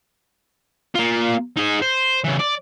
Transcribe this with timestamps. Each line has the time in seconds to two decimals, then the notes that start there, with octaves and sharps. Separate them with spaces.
0.95 A#3 F4
1.57 D#4 G#4
1.82 C5
2.24 C#3 E3
2.39 D5